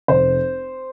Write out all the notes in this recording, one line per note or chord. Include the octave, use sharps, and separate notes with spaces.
F1 C5